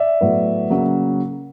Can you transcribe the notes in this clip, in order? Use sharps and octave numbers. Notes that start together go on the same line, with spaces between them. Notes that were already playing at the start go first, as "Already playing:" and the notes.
Already playing: D5 E5
A2 F#3 B3
C#3 F#3 A#3